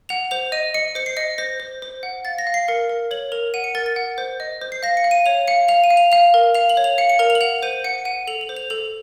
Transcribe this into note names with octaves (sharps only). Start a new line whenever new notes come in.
F#5 F7
C5 F7
D#5 D#7
D#5 C#7
C5 C#7
C7
D#5 C#7
C5 A#6
C5
C5
F#5
F5 A6
A#6
F5
C7
A#4 C#7
A#4
C#5 F#7
A#4 F7
F#5 D#7
C#7
A#4 A6
A6
F#5
C5
D#5
C5
C7
F5 A#6
C#7
F5
D#7
C#5 F7
F5 C#7
F5 F7
D#7
F5
F7
F5 F7
A#4
F5 F7
F#7
C#5
F7
F5 C#7
C#7
A#4 F7
F7
F#7
F#5 F7
C5 D#7
F#5 C#7
F#5 D#7
A4 F7
F#7
C5
F7
A4 F7